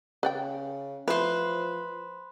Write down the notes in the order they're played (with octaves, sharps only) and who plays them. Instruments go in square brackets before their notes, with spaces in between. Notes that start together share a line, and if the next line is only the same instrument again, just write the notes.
[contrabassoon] C#3 [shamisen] B4 D5 G5
[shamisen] E3 A3 [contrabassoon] F3 [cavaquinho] B4 C5